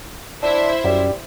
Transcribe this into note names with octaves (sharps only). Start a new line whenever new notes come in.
D4 E4 C5 E5
F#2 G3